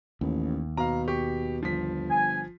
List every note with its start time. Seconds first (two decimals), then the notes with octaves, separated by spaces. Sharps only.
0.21 A1 D#2
0.77 B2 F5 A#5
1.08 G4 C#6
1.63 G1 F3 B6
2.10 G#5